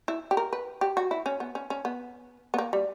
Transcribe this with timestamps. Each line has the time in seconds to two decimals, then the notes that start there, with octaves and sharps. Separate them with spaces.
0.08 E4
0.31 G4
0.37 A#4
0.53 B4
0.81 G4
0.97 F#4
1.11 E4
1.26 C#4
1.40 B3
1.55 C#4
1.70 C#4
1.85 B3
2.54 B3
2.58 A#3
2.73 G3